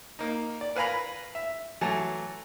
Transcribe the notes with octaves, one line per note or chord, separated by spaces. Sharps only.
A#3 D#4
D5
A#4 B4 F5 G#5 A#5 B5
E5
E3 F#3 A3 A5